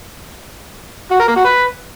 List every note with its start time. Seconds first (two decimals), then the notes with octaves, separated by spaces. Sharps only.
1.11 F#4
1.19 A#4
1.28 A#3
1.36 F#4
1.44 B4